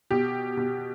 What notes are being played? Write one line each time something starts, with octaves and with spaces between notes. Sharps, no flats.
B2 G4
B2